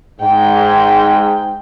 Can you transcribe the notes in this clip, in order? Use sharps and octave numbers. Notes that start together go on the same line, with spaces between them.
G#2 G5